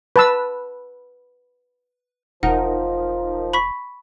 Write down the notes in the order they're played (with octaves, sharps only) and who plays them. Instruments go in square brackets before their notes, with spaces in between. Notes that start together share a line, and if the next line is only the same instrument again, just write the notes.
[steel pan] B4 A5 E6
[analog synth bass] E1 [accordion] F3 [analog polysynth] D#4 A#4 [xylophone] F#5
[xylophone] B5 C#6 B6